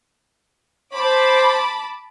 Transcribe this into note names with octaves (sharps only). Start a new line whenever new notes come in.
C5 A5 B5 D6